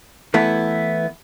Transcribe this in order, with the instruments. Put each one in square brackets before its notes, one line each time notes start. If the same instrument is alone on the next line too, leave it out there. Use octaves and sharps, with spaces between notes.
[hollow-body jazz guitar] E3 A3 B3 E4